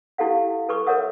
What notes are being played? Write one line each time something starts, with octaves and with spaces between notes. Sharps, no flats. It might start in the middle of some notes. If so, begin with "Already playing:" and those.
E4 G4 A4 F5 F#5
A4 B4 C#6 D6
A#4 C#5 E5 F#5 D#6